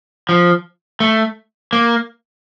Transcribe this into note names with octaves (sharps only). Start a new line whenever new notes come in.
F3
A3
A#3